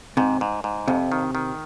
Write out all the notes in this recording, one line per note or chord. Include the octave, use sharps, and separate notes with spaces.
G#2 C3
G#2
G#2
F2 C3
D#3
D#3